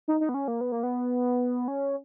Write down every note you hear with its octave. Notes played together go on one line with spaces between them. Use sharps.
D#4
D#4
B3
C#4
A#3
B3
A#3
B3
C#4